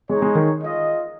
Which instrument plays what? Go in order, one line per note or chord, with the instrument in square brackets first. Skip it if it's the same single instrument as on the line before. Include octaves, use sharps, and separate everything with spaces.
[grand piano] G#3 [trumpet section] D#4 G#4 C#5
[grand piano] G#3
D#3
[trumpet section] F4 G#4 D#5